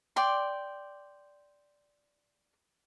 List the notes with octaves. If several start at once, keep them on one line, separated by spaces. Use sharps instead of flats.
D5 G5 C6